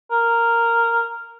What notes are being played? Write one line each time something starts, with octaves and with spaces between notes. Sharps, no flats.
A#4